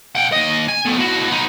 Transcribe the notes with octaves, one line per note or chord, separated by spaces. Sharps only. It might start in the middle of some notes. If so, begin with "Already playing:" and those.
F#5 G5
D#2 D#5
G#5
B2 A3
A2 F#4
B3 D#4